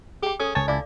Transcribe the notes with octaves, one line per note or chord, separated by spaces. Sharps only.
G4 G#4 G5
C#4 A4 D#6
C#2 C#5 G#5 A5
E4 D5 F5 D6